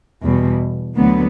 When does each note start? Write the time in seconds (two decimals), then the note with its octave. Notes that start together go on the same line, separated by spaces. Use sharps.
0.21 E2 B2 G3
0.97 D2 D3 F#3 B3